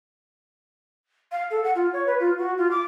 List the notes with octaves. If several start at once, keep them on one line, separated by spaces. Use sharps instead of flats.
F5
A4
F#5
F4
C#5
B4
F4
F#4
F4
D6